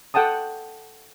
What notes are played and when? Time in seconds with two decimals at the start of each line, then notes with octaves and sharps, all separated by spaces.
0.14 A4 F#5 G5 A5 D#6